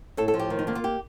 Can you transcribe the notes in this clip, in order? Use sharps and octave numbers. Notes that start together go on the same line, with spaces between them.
A2 A4
A4
F3
G4
D#3
D#4
A#3 D4
F4
G4